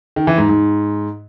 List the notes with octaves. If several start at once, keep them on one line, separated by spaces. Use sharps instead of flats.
D#3
E3
G#2
G#2